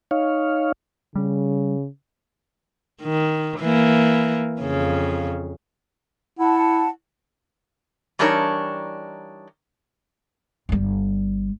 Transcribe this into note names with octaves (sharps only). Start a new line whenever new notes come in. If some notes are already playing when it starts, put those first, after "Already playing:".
D#4 C#5 F5
C#3 G3
D#3
E3 A#3
F2 C#3
E4 F#5 A5
E3 G3 D4 D#4 A#4 C#5
G1 G3